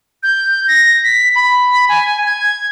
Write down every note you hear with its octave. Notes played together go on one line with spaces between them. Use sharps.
G6
A#6
B6
B5
G#5
G#6